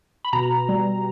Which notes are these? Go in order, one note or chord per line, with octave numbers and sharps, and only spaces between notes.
B5
B2 A#5
G3